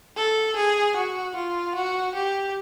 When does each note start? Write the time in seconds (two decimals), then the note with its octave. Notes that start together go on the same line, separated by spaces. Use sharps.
0.17 A4
0.56 G#4
0.96 F#4
1.36 F4
1.75 F#4
2.14 G4